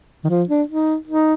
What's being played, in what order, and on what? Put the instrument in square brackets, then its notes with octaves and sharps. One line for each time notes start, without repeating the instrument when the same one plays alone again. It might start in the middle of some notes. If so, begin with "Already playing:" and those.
[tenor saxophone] D#3
F3
D4
D#4
D#4